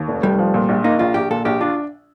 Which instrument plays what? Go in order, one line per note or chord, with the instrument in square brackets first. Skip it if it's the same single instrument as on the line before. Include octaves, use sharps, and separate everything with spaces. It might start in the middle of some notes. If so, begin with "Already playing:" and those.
Already playing: [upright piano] D#2
F1
[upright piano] F1 [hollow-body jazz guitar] G3
[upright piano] F3
A#2
A#1
[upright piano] A#3 [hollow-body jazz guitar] D#4
[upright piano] A#1 [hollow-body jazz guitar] F4
[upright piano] A#1 [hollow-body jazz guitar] G4
[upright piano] A#2 [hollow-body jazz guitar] A4
[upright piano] A#1 [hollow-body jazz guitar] G4
[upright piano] D4 [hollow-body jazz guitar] F4